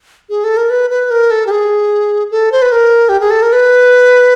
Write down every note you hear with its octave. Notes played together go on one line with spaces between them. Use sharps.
G#4
A4
A#4
B4
B4
A#4
A4
G4
G#4
A4
C5
B4
A#4
G4
G#4
A4
A#4
B4